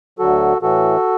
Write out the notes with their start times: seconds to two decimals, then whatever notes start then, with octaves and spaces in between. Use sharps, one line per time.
0.19 D2 D3 F#3 F#4 A4
0.62 A2 E3 F#4 A4